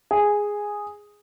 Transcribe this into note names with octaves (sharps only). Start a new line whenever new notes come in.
G#4